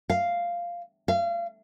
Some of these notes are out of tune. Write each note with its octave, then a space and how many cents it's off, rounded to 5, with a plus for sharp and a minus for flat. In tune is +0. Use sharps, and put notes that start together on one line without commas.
F5 -5
F5 -30